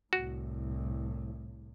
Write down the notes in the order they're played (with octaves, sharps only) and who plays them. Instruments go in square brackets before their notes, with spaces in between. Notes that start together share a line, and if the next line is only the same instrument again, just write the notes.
[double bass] C2 A2 [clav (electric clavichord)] F#4